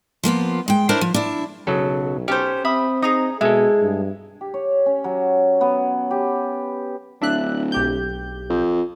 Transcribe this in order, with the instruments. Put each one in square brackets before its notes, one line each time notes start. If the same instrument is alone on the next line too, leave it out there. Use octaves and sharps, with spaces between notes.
[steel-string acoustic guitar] F3 A#3 B3 F4
G#3 G5
D4 E4 A#4 C5 C#5
F3
D4 E4
[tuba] B1 [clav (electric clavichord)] C#3 F#3 A4
[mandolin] C#4 A4 C5 [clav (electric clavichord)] G4
[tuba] C4 [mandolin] E5 B5 D#6
[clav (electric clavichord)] D#4 [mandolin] G#4 A#5 D#6
[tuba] B2 [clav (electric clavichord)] G#3 A4 [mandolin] E4 [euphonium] G#4
[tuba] G2
[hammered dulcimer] G4
C#5
C#4
F#3
B3
G4
[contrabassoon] D1 [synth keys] D4 E5 F#6
[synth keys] B1 G4 G6
[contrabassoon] F2